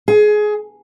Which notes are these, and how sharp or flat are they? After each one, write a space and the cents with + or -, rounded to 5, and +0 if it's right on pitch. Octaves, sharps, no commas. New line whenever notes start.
G#4 +20